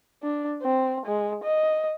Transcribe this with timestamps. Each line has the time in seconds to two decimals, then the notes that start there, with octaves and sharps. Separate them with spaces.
0.22 D4
0.62 C4
1.06 G#3
1.44 D#5